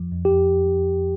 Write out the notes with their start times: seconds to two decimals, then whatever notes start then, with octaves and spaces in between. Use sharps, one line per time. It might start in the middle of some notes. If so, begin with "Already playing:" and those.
Already playing: F2 F3
0.12 F2
0.25 G4
0.32 F2